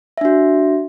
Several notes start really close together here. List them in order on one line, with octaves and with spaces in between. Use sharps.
E5 D4 F#4